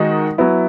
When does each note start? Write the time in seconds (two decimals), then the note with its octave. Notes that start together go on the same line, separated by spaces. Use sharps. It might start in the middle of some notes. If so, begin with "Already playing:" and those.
Already playing: D#3 G#3 D#4 F#4
0.38 F#3 B3 E4